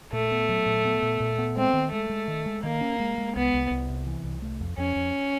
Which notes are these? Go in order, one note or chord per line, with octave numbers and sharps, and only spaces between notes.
A#2 A3
B3
F#3
A#2
B3
A#2
A#2
B3
G#3 C4
D#3
G#3 A3
G#3
D#3
G#3
D#3 A#3
C#4
G#3
G#3
C2 B3
C2
C2
C3
E3
C2
A3
F2
F2 C#4
F2